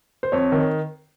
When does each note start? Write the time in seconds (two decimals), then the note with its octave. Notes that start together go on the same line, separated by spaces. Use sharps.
0.23 C5
0.32 F2 C#5
0.52 D#3